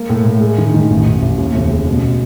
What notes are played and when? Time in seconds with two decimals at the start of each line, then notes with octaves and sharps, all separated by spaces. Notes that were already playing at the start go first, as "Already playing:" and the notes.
Already playing: A#3
0.09 A2
0.25 A2
0.41 G#3
0.58 D#3
0.74 D#3
0.90 A1
1.06 A1
1.22 A1
1.38 D#2
1.55 F1
1.71 C#3
1.87 B2
2.03 B2